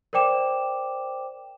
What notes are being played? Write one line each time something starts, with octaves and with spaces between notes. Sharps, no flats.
A#4 C5 D5 G5 D6 E7